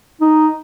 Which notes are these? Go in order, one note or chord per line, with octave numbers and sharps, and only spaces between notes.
D#4